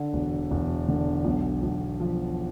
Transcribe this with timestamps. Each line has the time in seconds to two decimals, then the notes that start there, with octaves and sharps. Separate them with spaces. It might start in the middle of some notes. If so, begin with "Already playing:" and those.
Already playing: D3
0.13 E1
0.51 E1
0.88 D3
1.25 B1
1.63 B1
2.00 F3